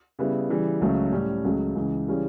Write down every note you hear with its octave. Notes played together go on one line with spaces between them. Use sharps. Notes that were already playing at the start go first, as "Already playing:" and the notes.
C#3 G3 B3 E4
C#3 E3 G3
C#2 C#3 F#3 A3 C#4
A2 G3 C#4
C#2 C#3 F#3 A3
C#2 C#3 E3
C#3 E3 G3 C#4